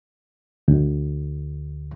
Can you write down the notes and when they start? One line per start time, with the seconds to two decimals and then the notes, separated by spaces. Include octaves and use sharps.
0.68 D2